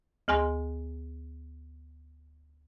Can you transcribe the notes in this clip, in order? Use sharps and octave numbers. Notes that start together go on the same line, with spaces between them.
D2 G#4 G#5 C6